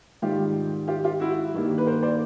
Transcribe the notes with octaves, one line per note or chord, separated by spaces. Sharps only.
G#2 D#3 G3 F4 G4
F4 G4
F4 G4
E4 F#4
G2 D#3 G3 A#3
B4
A#4 C5
C5 D5